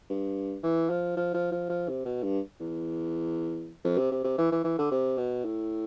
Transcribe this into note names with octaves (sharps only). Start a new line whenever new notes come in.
G2
E3
F3
F3
F3
F3
F3
C3
B2
G2
E2
F2
C3
C3
C3
E3
E3
E3
D3
C3
B2
A2